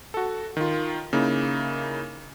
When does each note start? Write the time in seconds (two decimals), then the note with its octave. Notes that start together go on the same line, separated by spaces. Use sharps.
0.14 F#4 A4
0.57 D#3 F4
1.13 C#3 A#3 D#4 E4